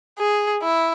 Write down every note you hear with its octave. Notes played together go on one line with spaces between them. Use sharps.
G#4
E4